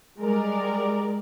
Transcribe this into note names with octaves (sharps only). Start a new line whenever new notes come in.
G3 G#3 A#4 D5